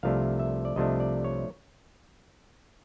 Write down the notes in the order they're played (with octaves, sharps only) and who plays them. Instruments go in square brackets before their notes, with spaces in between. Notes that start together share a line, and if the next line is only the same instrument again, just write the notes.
[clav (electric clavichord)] C2 C3 F3 A3 D4 F5
E5
D5
C2 C3 F3 A3 D4 D#5
D5
C#5